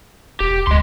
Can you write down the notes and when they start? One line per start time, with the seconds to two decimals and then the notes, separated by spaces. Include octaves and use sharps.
0.40 E1 G4
0.67 D2 G#3 C6